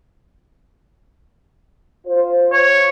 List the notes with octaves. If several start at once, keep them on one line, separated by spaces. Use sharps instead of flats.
F4 C5
C#5